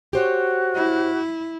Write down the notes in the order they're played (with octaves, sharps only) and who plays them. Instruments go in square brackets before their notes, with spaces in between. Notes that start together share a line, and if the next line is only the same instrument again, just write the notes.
[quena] F#4 [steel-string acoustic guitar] G4 C5 C#5
[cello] E4